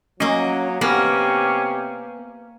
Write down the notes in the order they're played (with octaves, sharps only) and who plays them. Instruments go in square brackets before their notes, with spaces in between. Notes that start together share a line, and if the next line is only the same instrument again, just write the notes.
[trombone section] F#3 [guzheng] A#3 D#5 [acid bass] C#4
[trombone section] C3 G4 [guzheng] A#3 [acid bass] B3 [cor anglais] C#4